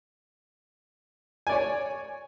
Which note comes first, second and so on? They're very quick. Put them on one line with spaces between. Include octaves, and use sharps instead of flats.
G#5 D5 C#5